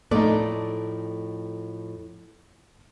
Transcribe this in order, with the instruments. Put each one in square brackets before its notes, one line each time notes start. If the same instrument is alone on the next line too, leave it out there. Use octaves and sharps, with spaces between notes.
[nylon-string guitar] F2 A2 D5 [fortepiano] A3 D#4